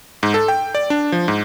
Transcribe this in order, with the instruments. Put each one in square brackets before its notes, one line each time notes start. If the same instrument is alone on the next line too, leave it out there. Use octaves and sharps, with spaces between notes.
[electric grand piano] G#2
A4
G5
D5
D4
F3
G#2